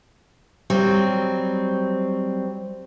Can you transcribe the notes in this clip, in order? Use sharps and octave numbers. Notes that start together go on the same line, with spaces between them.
F#3 G3 C4